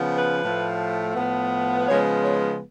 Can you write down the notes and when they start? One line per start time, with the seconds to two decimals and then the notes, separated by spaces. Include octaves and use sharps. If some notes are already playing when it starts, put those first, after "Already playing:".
Already playing: C#3 F3 B3
0.18 B4
0.42 A2 F3 A3
1.15 A2 F3 B3
1.89 C#3 F3 G#3 B3 C#5
2.25 C#5